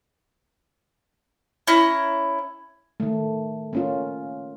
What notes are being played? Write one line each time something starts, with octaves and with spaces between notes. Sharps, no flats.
C#4 E4 A#5
D#3 A3
A#3 C#4 F4